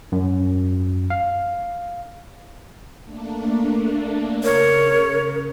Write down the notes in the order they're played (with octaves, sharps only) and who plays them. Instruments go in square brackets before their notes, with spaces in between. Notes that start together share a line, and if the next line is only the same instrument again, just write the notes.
[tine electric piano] F#2
F5
[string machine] A3 A#3 D4
[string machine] C#3 [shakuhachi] A#4 [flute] C#5